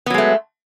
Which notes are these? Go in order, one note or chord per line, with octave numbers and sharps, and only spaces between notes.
F#3 G#3 A3 B3